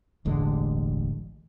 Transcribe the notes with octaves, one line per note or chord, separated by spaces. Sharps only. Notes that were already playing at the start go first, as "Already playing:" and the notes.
E1 A1 D3 G#3